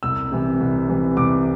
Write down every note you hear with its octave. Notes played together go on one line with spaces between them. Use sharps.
C2 E6
C3 E3
C2
C3 E3
C2 D6